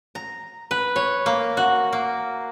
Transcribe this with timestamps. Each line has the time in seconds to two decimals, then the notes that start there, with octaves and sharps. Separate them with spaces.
0.15 A#5
0.71 B4
0.96 C#5
1.26 A#3
1.57 F#4
1.93 A#3